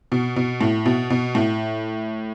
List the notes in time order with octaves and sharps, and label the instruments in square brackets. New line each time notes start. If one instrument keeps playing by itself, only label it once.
[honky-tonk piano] B2
B2
A2
B2
B2
A2